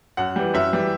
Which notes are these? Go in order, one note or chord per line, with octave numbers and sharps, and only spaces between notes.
F#2 F#5
E3 G3
F#2 E5
E3 G3